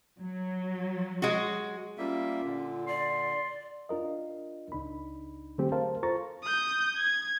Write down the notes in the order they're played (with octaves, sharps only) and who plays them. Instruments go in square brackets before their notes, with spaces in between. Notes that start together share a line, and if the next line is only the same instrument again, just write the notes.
[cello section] F#3
[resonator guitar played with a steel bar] G#3 F#4
[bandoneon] G3 A#3 E5 [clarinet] C#4 [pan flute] F4
[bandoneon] A#2 D3
[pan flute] D5 [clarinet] C6
[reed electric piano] D4 F4 A#4 D#5
C#2 D4 D#4 B5
D3 F#3 A3 C4 G4 G#4
A#4 C5 F5 A5
F4 A4 C5 A#5 C#6 A6
[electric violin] D#6 G6
G#6